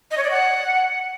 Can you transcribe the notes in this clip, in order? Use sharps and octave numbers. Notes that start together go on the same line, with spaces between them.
D#5
C#5
D5
F#5